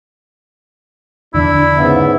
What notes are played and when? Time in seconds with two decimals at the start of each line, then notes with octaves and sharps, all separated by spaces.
1.34 E2 D3 F3 D4 E4
1.77 G#2 C#3 B3 E5